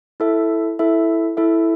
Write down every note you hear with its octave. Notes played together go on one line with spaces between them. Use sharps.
E4 A4 E5
E4 A4 E5
E4 A4 E5